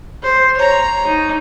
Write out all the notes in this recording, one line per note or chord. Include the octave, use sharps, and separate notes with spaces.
C5
C#5 A#5
D#4